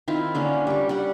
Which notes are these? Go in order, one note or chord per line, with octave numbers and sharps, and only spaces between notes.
D#3 C4 E4 F4
D3 A#3 C#4
G3 C#6
G3 F#5